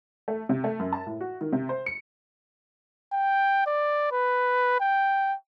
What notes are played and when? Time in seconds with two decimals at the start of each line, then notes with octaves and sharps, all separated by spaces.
0.28 A3
0.49 C3
0.64 A3
0.79 F#2
0.93 A5
1.06 A2
1.21 F#4
1.41 D#3
1.53 C3
1.69 C5
1.86 C#7
3.13 G5
3.67 D5
4.12 B4
4.80 G5